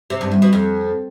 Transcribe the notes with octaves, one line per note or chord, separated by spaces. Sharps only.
C3
G2
E2
B2
F2